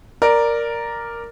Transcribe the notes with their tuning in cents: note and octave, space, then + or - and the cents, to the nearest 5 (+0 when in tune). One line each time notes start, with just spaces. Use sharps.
A#4 +0 D5 +0